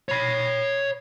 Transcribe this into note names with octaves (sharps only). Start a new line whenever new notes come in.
C#5 B5